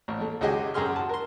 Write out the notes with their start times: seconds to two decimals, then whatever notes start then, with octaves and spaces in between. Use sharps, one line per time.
0.08 A1
0.21 A3
0.41 C#2 G#3 F#4 G4 D#5 G#5
0.74 F#2 G4 G#4 C6 F6
0.96 F#4 A5
1.09 A#4 C6